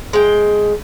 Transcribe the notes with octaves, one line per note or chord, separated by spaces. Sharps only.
G#3 G5